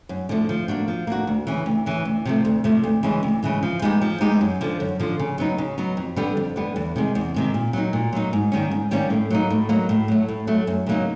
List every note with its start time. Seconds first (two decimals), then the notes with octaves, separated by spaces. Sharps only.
0.09 F#2
0.29 D3 F3 A3
0.49 F3
0.68 A#3 D4 F#4
0.88 F3
1.07 A#3 D4 F#4
1.27 D2
1.47 C#3 E3
1.66 D2
1.86 C#3 E3
2.05 D2
2.25 C3 F3 A3
2.45 D2
2.64 C3 F3 A3
2.83 D2
3.03 C#3 E3 G#3
3.23 D2
3.43 C#3 E3 G#3
3.63 F3
3.82 G#3 B3 D#4 G4
4.02 F3
4.21 G#3 B3 D#4 G4
4.41 F#2
4.61 D3 F3
4.80 F#2
5.00 D3 F3
5.19 C#3
5.38 F#3 B3 D#4
5.58 C#3
5.78 F#3 B3 D#4
5.97 F2
6.16 D3 G3 B3
6.37 F2
6.56 D3 G3 B3
6.76 E2
6.96 C3 D#3 G#3
7.15 E2
7.34 C3 D#3 G#3
7.54 A#2
7.73 F#3 A#3 D#4
7.93 A#2
8.13 F#3 A#3 D#4
8.33 G#2
8.52 D#3 G3 A#3 C#4
8.71 G#2
8.91 D#3 G3 A#3 C#4
9.10 A2
9.30 F#3 A#3 D#4
9.50 A2
9.69 F#3 A#3 D#4
9.89 A2
10.08 F#3 A3
10.28 A2
10.47 F#3 A3
10.67 F#2
10.86 C#3 F#3 A#3 D#4